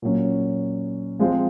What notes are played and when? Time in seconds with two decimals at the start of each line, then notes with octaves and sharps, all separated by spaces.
0.02 A#2 F#3 C#4
1.19 F3 G#3 C4 F4